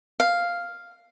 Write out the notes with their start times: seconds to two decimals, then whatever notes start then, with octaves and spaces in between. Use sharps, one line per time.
0.20 F5